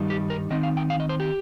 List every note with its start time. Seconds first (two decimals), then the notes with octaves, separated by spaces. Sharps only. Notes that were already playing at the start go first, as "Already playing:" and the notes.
Already playing: G2 D#3 G3 D#4
0.10 G4
0.30 A#4
0.50 D#3 C4 D#4 D#5
0.63 F5
0.77 G5
0.90 F5
1.00 D#5
1.09 C5
1.20 G4